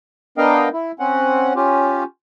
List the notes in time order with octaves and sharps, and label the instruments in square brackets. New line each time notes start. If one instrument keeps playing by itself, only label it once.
[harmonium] B3 D4 A#4 D#5 F5 G5
E4
C4 C#4 F#5
C#4 F4 G4